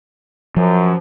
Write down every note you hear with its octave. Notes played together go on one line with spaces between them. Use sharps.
F#2 F3